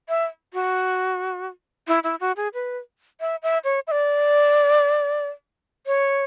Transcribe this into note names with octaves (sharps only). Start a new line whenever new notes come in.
E5
F#4
E4
E4
F#4
G#4
B4
E5
E5
C#5
E5
D5
C#5